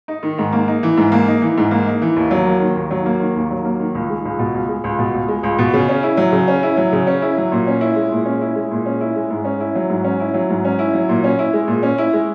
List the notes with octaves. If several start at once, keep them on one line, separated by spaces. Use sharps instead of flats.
D#4
D#3
G#2
A#3
D#4
E3
G#2
A#3
D#4
E3
G#2
A#3
D#4
E3
D#2
F#3
A#3
D#3
D#2
F#3
A#3
D#3
D#2
F#3
A#3
D#3
C#2
G#3
C#2
B2
C#2
G#3
C#2
B2
C#2
G#3
C#2
B2
C#3
C#4
E4
F#3
C#3
C#4
E4
F#3
C#3
C#4
E4
F#3
A#2
C#4
E4
G#3
A#2
C#4
E4
G#3
A#2
C#4
E4
G#3
G#2
C#4
E4
F#3
G#2
C#4
E4
F#3
G#2
C#4
E4
F#3
A#2
C#4
E4
G#3
A#2
C#4
E4
G#3